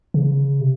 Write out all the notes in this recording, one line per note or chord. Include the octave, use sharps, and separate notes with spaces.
C#3
C3